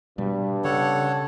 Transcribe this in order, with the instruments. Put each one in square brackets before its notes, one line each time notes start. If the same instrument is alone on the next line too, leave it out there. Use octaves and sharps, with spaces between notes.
[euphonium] G2 [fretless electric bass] B2 G3
[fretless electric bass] C#3 [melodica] A4 C#5 F#5